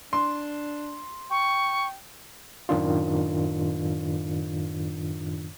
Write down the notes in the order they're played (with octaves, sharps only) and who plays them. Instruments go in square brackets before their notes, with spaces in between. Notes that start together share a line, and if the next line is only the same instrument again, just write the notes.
[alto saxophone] D4 [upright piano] C6
[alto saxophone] G5 [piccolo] C#6
[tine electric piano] F#2 A2 D#3 D4 F4